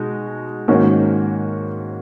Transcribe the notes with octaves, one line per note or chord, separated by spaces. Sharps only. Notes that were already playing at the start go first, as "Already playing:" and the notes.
Already playing: B2 G#3 D#4 F#4
G#2 D#3 A#3 C#4 F#4